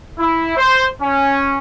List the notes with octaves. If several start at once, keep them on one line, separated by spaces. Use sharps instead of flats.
E4
C5
C#4